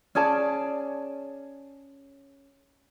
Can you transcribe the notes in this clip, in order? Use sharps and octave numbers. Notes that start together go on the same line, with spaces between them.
C#4 G#4 D5 A5